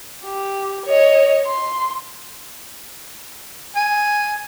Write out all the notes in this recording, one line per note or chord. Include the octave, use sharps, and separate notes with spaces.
G4
C#5 D#5
C6
G#5